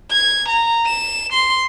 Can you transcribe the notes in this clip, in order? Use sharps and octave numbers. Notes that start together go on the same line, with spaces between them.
G#6
A#5
E7
C6